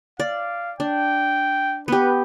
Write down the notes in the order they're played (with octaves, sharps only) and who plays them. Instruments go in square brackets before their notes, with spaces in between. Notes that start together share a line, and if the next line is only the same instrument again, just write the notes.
[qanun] D5 [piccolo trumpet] F5
[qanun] D4 [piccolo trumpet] G5
[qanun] B3 G4 [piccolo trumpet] B4